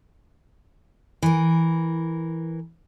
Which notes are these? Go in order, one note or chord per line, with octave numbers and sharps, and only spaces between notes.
E3 A#4